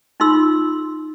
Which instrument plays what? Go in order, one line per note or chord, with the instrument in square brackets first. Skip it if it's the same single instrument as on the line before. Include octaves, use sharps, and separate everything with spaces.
[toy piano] D#4 F4 C6 E6